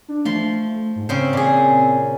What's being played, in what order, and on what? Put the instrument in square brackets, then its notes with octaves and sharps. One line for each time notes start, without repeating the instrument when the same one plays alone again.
[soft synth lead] D4
[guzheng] F3 C6 [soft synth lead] A3
[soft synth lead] G#2
[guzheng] C#3 C5 [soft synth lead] C4
[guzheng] A#2 G#4